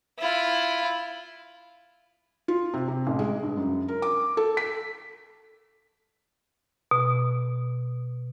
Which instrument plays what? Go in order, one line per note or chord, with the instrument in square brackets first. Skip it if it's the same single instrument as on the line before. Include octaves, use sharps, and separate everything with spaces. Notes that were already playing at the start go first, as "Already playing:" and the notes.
[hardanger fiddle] E4 F4
[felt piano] F4
C3
C3
A1
G#3
G2
F#2
A#4
D6
A4
B6
[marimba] B2